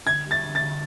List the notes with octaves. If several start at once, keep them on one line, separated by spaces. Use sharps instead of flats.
D3 G#6
G3
A6
D3
A6
D3